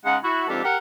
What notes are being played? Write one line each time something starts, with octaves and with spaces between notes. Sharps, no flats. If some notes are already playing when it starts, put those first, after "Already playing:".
C#3 G#3 D#4 F#5
E4 F#4
F2 G#2 D4 G4 A4
G4 A#4 F#5